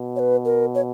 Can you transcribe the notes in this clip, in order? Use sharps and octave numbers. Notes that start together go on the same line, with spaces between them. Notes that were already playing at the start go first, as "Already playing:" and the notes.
Already playing: B2
C#5
B4
A#4
C#5